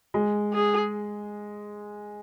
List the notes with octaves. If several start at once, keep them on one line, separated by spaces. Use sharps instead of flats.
G#3
G#4